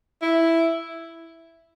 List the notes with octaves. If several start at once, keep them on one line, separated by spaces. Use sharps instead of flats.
E4